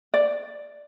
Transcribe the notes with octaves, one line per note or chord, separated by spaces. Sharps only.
D5